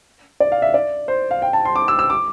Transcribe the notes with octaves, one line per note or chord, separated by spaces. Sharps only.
D5
F5
E5
D5
C5
F5
G5
A5
C6
D6
E6
E6
D6